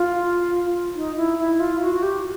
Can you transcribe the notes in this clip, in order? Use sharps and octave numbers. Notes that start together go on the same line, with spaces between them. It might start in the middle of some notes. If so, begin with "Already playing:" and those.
Already playing: F4
D#4
E4
E4
F4
F#4
G4